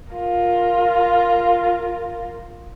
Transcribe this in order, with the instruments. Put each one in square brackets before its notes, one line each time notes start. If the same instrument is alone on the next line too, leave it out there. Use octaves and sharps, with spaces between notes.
[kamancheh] F4 A#4